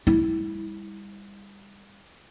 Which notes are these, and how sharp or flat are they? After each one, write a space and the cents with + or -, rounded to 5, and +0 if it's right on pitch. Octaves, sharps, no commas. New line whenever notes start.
G3 +35 E4 -20